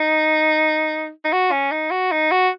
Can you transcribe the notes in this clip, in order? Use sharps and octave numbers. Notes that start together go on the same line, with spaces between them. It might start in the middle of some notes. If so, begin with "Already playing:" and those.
Already playing: D#4
D#4
F#4
C#4
D#4
F#4
D#4
F#4